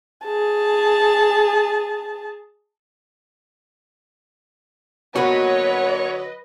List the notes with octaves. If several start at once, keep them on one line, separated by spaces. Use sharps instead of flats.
G#4 A5
D3 F#3 A#3 B3 F#4 B4 C#5 D#5